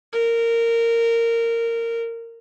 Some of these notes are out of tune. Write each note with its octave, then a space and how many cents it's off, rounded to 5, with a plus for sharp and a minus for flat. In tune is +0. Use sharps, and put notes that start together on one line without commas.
A#4 -15